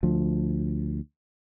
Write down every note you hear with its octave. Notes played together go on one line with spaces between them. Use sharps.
D2 F3